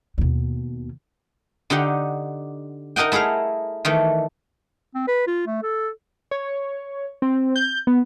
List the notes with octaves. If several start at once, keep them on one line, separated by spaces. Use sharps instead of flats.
D#2 B2
D3 D#4 G4 F#5
D#4 A#4 D#5 F#5 G5
A3 E4 G#4 A#4 F5
D#3 E3 A3
C4
B4
F4
A3
A4
C#5
C4
G6
B3